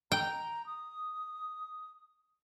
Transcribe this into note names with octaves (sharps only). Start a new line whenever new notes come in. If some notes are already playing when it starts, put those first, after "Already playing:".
G5 A#5
D#6